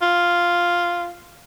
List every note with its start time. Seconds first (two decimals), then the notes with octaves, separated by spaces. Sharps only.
0.02 F4